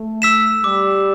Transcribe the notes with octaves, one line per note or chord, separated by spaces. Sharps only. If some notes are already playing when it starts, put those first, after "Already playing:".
Already playing: A3
E6 B6 E7
G3 D6